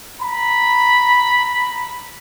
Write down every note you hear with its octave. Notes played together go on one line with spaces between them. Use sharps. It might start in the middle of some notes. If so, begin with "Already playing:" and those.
A#5 B5